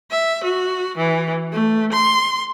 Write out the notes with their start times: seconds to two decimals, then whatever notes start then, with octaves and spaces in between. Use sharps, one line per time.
0.11 E5
0.44 F#4
0.97 E3
1.53 A3
1.92 C6